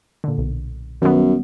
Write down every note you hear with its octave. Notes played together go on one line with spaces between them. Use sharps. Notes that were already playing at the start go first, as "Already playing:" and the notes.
A#2 D3
B1
F#2 D#3 G3 B3